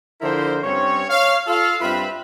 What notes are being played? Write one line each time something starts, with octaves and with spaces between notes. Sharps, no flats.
D3 F3 E4 A#4 C5
G2 C4 C#4 C#5
C#5 F5
F4 A4 F5
G2 C4 F4 B4 E5 B5